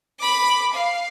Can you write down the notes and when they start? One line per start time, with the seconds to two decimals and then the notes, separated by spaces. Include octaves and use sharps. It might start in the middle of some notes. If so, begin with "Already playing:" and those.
0.20 B5 D6
0.73 F5